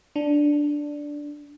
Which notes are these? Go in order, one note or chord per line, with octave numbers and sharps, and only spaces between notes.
D4